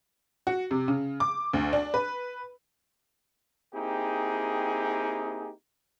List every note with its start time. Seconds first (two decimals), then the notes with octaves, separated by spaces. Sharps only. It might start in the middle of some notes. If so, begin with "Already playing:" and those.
0.47 F#4
0.71 C3
0.88 C#3
1.20 D6
1.53 D2
1.73 D4
1.94 B4
3.74 A#3 C4 D#4 E4 G4 G#4